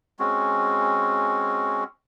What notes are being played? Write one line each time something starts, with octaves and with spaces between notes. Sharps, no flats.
G#3 C4 C#4 F#4